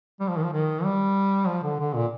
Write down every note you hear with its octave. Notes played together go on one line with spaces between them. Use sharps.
G3
F3
D#3
F3
D#3
G3
F3
D3
D3
A#2